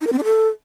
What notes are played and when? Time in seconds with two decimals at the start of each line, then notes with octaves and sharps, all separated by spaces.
0.01 D#4
0.07 A#4
0.13 C4
0.18 D4
0.24 A4